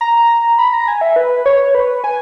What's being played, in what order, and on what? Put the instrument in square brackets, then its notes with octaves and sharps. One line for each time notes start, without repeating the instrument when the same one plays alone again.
[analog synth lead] A#5
B5
A#5
G#5
E5
B4
C#5
B4
G#5